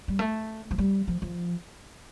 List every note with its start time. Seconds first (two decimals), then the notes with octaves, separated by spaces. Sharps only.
0.08 G3
0.19 A3
0.71 F3
0.78 G3
1.08 F3
1.22 F3